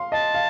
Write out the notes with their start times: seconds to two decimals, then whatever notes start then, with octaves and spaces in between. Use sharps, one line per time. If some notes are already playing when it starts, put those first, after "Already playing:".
Already playing: F5 C6
0.12 D#5 A5
0.34 F5